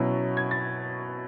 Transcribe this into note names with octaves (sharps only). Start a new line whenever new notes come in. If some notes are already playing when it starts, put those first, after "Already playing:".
Already playing: B2 F#3 C#4 E4
G#6
A6